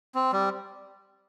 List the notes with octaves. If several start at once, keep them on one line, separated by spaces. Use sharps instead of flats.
C4
G3